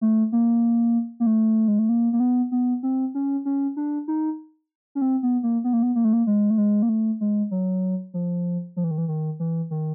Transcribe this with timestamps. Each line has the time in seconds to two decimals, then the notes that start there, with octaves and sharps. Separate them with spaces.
0.01 A3
0.32 A#3
1.20 A#3
1.26 A3
1.68 G#3
1.79 A3
1.89 A#3
2.13 A#3
2.20 B3
2.52 B3
2.83 C4
3.15 C#4
3.45 C#4
3.77 D4
4.08 D#4
4.95 C#4
5.01 C4
5.23 B3
5.43 A#3
5.64 B3
5.73 A#3
5.83 B3
5.95 A#3
6.04 A3
6.13 A#3
6.27 G#3
6.50 A3
6.58 G#3
6.82 A#3
6.89 A3
7.21 G#3
7.51 F#3
8.14 F3
8.76 F3
8.84 E3
8.91 D#3
8.98 E3
9.08 D#3
9.40 E3
9.71 D#3